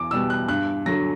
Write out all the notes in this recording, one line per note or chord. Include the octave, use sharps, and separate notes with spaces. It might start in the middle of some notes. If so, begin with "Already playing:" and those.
Already playing: E2 D6
B2 G3 B3 E6
F#6
G2 F#6
D3 F#3 A#6